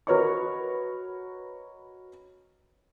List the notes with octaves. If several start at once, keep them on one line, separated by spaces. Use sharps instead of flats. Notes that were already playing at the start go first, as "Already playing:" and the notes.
F#4 A#4 B4 C#5 D#5 C#6